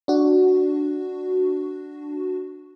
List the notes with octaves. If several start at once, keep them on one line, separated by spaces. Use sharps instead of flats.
D4 F#4